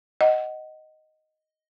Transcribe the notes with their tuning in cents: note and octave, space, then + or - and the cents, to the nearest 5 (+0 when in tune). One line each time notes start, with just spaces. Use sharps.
D#5 +0 F#5 +20